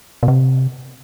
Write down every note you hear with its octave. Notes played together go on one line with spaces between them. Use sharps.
B2
C3